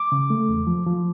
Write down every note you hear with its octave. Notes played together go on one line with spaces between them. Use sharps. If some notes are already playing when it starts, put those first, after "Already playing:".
Already playing: D6
C#3
A3
E2
F3
F3